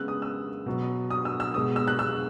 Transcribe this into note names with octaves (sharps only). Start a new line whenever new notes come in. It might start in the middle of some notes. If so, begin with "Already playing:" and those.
Already playing: C#3 G#3 B3 E6 F#6
D#6
E6
B2 F#3 B3
D#6
E6
E6
B2 G#3 B3 D#6
E6
F#6
E6